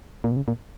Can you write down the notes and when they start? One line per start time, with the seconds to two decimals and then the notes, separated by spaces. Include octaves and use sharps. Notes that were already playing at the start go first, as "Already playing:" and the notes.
0.24 A#2
0.32 B2
0.36 C#3
0.48 A#2